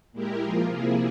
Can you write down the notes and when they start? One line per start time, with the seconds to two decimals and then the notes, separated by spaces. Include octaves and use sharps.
0.12 A#2 G#3 E4 G4 A#4
0.40 F3 A#3 F4 G#4
0.69 C3 F3 A#3 E4 G#4